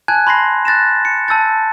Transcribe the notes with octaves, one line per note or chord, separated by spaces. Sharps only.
G#5 A5 F#6 G#6
B5 C6 A#6 C7
F#6 A6 A#6 E7
C#7
A5 E6 G6 A6